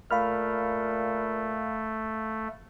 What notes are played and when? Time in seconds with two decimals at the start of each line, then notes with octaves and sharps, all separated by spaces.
0.11 A#2 A3 F5 B5 F6